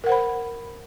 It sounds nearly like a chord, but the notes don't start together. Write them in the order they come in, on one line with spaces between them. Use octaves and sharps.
A#4 F#5 C5 B5